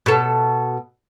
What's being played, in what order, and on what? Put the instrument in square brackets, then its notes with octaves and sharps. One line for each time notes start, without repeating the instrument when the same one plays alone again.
[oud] B2 A4